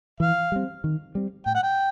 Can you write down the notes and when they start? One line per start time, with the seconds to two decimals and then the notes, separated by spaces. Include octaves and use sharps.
0.20 E3 F5
0.52 G3 C4
0.84 D#3
1.15 G3 C4
1.46 A2 G5
1.55 F#5
1.63 G5